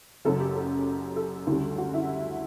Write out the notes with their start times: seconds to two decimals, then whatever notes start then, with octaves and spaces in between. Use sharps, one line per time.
0.25 F#1 F#2 C#3 F#3 A4
0.40 G4
0.55 A4
1.16 A4
1.47 D2 C#3 G3
1.78 F#4
1.94 E4